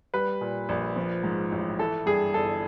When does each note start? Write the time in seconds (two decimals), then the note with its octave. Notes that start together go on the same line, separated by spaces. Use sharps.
0.14 G3 B4
0.41 A#2
0.69 A#1
0.96 F3
1.24 G#2
1.52 A1
1.79 E3 A4
2.06 G2 G#4
2.34 G1 A4